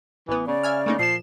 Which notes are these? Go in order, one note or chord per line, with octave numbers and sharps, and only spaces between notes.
A1 E3 B3
C#3 D5
E5 G#5 F6
C#3 A3 A#3 D#4
A#2 F3 C7 E7